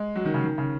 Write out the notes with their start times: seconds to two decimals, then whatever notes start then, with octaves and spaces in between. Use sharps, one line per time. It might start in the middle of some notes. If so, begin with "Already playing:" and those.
Already playing: G#3
0.16 F#3
0.25 D#3
0.34 C#3
0.44 D#3
0.58 C#3